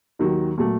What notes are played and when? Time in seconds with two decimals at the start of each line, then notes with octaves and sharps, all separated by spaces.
0.19 D#2 D#3 F#3
0.58 A#2 F#3 A3